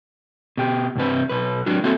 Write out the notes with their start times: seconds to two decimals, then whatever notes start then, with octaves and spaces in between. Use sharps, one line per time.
0.57 B2 G4
0.95 C2 G2 C4 B4
1.29 B1 B4
1.66 F#3 D4 F#4
1.84 A#3 C4 E4 F#4 A4